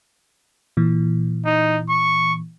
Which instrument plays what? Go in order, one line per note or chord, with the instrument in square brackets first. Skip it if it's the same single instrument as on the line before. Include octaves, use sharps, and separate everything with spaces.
[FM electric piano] A#2 E3
[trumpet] D#4
C#6